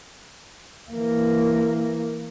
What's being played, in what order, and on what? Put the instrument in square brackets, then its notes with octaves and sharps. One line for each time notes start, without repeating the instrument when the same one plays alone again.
[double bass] E3 A#3